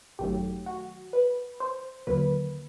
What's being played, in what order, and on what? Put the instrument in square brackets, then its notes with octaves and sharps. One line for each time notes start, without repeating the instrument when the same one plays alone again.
[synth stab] G#1 F#2 D#3 F#3 A3 G4
F#4
B4
C5
D#2 D3 F#3 A#3 B4